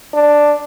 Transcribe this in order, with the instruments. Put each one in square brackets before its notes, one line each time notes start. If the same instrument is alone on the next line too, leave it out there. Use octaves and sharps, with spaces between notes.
[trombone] D4